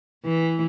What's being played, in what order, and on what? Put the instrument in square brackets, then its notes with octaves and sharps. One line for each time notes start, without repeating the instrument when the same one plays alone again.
[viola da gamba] E3